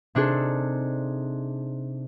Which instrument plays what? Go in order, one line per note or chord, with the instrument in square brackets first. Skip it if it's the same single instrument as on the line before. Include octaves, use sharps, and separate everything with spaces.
[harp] C3 D4 D#4 G#4 A4